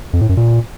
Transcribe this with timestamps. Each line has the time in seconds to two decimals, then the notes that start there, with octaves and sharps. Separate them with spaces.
0.13 F2
0.21 A2
0.29 F#2
0.37 A#2